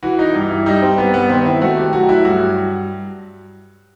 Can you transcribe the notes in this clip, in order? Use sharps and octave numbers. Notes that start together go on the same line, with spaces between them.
E3 F#4
D#4
G2
E4
G3 D#4
C4
G2 B3
B3
D#3 C4
E4
A3 F#4
G4
F#3 F#4
E4
G2 F#4